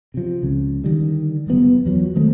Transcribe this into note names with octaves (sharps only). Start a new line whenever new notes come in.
C3 F3
C#2 C#3
D3 D#3 G3
F#1 F3 G3 B3
E2 F3 F#3
D#3 G#3 A3 C4